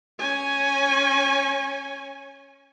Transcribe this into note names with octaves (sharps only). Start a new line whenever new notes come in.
C#4 G#5